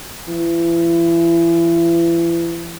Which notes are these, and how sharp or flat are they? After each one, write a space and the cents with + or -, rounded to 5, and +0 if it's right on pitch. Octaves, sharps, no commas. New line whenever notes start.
E3 +35